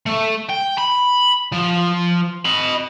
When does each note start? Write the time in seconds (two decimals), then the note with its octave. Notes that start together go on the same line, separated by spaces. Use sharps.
0.06 A3
0.49 G5
0.78 B5
1.52 F3
2.45 D#5 B5